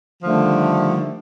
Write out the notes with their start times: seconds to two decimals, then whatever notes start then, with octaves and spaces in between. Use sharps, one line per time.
0.23 D3 D#3 F3 G3 A3